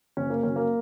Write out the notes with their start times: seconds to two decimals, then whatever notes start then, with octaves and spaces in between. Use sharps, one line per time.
0.17 F#1 C#4
0.30 A#3
0.43 F#2 C#3 F#3 C#4
0.56 A#3